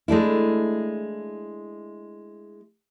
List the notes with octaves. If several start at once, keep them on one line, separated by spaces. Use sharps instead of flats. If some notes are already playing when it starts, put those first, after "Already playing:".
G#3 A3 D4 E4